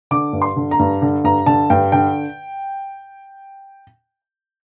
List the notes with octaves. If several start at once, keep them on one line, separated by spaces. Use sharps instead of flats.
D3 D6
G2
C6
D3
A#5
G2
D3
G2 A#5
D3 A5
G2 G5
D3 G5